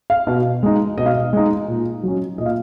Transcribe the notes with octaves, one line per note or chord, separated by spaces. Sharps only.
F5
B2
G#3 D#4
B2 D#5
F5
D#5
G#3 D#4
A#2
F#3 C#4
A#2 D#5
F5